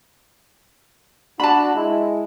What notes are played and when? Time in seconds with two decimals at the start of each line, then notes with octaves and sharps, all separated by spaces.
1.40 D4 F#4 A5 B5
1.75 G#3 E4